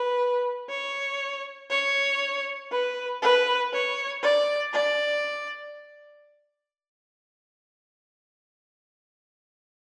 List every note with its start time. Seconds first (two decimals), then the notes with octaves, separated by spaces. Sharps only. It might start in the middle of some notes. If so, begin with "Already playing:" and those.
Already playing: B4
0.69 C#5
1.70 C#5
2.72 B4
3.22 B4
3.73 C#5
4.23 D5
4.73 D5